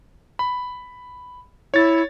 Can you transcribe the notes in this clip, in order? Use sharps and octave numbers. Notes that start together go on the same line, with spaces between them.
B5
E4 C#5 A6